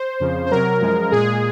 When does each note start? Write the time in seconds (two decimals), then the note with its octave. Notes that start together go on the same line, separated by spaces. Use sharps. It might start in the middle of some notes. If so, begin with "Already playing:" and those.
Already playing: C5
0.20 F2 C#3 F3
0.46 C5
0.51 C3 F#3 A#4
0.81 F#2 F3 G#3
1.11 A#2 G#3 G#4